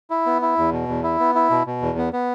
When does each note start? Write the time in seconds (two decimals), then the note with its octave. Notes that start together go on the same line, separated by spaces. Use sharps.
0.10 E4
0.26 B3
0.42 E4
0.58 E2
0.73 B2
0.88 E2
1.03 E4
1.20 B3
1.35 E4
1.50 B2
1.66 B2
1.82 E2
1.98 B3
2.13 B3